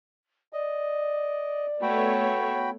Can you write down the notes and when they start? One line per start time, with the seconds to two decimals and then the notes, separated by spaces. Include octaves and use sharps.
0.53 D5 D#5
1.82 A3 B3 F#4 C#5 G5 B5